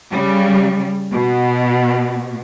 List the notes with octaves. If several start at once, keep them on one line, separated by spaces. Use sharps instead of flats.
C#3 G3
B2